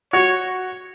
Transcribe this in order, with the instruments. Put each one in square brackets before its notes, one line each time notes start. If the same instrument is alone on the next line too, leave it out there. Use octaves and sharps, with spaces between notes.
[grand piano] F#4 [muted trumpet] C#5